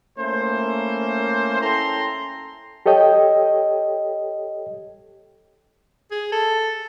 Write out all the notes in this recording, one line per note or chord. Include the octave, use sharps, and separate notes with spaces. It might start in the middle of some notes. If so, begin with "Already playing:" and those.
A3 A#3 C#4 E4 C5
C#4 E4 A4 G5 A#5 C6
G4 A4 C#5 D#5 G5
G#4
A4